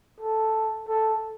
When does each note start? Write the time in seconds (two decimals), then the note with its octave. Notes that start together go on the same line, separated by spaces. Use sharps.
0.20 A4
0.88 A4